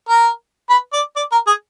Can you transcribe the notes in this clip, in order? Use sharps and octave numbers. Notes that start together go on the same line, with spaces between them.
A#4
B4
D5
D5
A#4
G#4